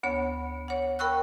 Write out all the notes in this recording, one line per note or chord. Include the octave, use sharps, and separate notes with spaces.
D2 B3 C#5
C#5 F#5
A#4 G5 B5 C#6 E6 F#6